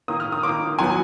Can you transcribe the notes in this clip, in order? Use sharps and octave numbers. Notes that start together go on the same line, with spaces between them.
D#3 A#3 D#6
F6
D#6
D#3 A#3 D6
D#3 F#3 B3 G#5